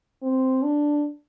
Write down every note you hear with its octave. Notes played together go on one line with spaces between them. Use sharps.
C4
D4